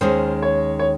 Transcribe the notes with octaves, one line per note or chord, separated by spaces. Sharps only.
D#2 D#3 G#3 C#4 C5
C#5
C#5